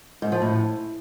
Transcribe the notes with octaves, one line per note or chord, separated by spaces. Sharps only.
G#2
F3
A2